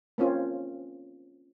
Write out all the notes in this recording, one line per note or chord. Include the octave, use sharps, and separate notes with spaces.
A#3 C4 C#4 F4